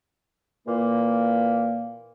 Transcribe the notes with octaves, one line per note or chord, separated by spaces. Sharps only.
A#2 E3 A#3